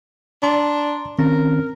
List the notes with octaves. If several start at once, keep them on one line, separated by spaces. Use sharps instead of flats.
D4 A#5 C6
D#3 C4 C#4 A#4